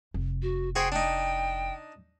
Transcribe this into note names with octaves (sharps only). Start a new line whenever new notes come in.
F1
F#4
F#4 G#4 C5 G5
D4 D#4 G5